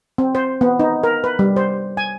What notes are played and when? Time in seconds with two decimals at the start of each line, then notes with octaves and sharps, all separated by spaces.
0.18 C4
0.35 C5
0.61 B3
0.79 D#4
1.03 A#4
1.24 B4
1.39 G3
1.56 C5
1.97 G#5